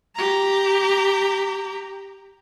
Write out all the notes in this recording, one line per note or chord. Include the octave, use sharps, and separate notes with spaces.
G4 A#5